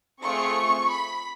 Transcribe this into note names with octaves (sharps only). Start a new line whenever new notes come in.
A3 C4 F4 G#4 C#6
B5